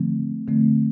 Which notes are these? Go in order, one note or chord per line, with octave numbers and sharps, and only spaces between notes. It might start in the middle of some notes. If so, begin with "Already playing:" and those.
Already playing: D3 F3 A3 C4
D3 F3 A3 C4